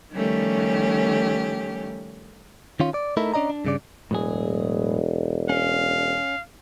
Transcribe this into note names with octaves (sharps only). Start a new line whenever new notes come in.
D#3 F3 G3 A3 C#4 G4
D#3 C#4 F4
D5
A3 D#4 E4 A#4
C#4 D4 D5 D#5 A#5
D4
G2 C#3 D5
E1 A2 F#3 G#4
C#4 F5